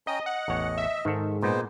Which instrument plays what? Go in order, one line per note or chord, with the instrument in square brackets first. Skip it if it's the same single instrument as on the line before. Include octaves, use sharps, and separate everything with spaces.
[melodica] C#4 G5 A#5 [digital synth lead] D#5
[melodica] D#5 [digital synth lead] F#5
[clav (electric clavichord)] A1 E2 C#5
[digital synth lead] E5
[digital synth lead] G#2 [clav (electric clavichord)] D#3 A4
[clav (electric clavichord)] A#2 [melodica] G#3 B3 C5